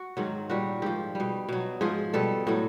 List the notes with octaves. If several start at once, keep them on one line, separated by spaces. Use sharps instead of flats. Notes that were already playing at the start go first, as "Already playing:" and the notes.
Already playing: F#4
G#2 D#3 F#3
A#2 G3 F#4
G#2 F3 G4
B2 G3
B2 F#3
G#2 F3 G#4
B2 G3 A4
A2 F#3